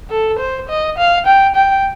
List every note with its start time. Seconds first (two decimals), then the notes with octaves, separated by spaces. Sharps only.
0.10 A4
0.39 C5
0.69 D#5
0.98 F5
1.26 G5
1.55 G5